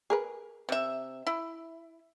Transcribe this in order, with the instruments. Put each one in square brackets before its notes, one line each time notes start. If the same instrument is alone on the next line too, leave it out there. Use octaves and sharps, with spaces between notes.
[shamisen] G#4 A#4 B4
[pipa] C3 E5
E4